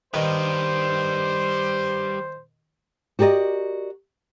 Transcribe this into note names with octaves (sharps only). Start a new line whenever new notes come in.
D#3 G3 B4 C5
F#4 G4 A#4 D5 D#5